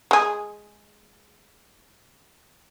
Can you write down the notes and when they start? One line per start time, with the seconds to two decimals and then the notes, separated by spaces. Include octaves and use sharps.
0.11 G#3 G#4